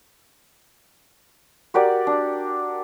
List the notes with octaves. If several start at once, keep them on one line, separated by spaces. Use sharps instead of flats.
F#4 G4 A#4 D5
D4